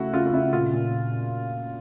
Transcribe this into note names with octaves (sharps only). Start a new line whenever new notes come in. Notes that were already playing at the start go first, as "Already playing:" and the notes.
Already playing: C#3 A3 E4 F#4
C#3 F4
F4
C#3 E4
A#2 F4
A#2